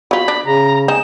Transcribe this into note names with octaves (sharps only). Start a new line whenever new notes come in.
F#3 F4 B5
D4
C#3 A#5
G#3 D#4 G#4 E7